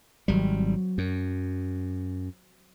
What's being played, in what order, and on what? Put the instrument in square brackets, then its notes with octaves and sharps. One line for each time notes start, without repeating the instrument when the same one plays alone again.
[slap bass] G#1 G3 [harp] F#3 C4
[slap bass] F#2